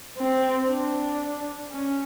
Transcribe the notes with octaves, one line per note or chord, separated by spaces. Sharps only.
C4
D4
C#4